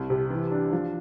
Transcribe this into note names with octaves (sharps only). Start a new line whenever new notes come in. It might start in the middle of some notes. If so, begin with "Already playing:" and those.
Already playing: C2
C3
E3
D4
F3